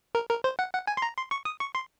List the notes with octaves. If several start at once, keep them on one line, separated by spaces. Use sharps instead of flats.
A#4
A#4
C5
F#5
F#5
G#5
C6
A#5
C6
C#6
D#6
C#6
C6